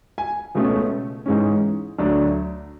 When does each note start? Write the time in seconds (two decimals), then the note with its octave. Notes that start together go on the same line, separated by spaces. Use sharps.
0.18 G#5
0.55 C#2 B2 A3 C#4
1.26 G#2 E3 G#3 C#4
1.98 D2 D3 F#3 A3 D4